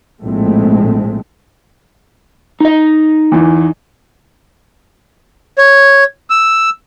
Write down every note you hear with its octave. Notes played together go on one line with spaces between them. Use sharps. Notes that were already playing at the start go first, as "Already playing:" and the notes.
A#1 A2 G#3 A3 C4
D#4 D#5
E2 E3
C#5
E6